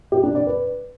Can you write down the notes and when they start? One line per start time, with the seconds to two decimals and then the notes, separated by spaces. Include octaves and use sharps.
0.12 G4
0.23 D4
0.35 D5
0.47 B4